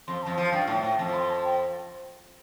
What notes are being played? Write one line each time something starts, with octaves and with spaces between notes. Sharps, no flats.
F2 C6
F2 A5
F3 A5
G2 G5
A2 G5
A2 G5
F2 A5
C6
A5
G5